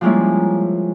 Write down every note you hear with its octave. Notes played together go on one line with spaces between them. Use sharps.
F3 G3 G#3 A#3 C#4 E4